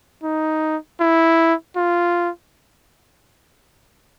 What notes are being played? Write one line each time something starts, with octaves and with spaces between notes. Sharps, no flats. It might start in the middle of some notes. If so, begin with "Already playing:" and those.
D#4
E4
F4